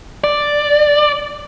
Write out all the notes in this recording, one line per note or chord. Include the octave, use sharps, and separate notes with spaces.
D5